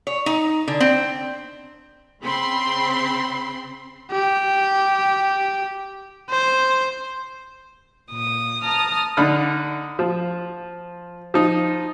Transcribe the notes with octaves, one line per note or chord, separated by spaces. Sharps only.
C#5
D#4
D3
C4
C#3 C4 B5 C6
G4
C5
A#2 D#6
A5 A#5 D#6 F6
D3 D#4 B5 F6
F3
F3 D#4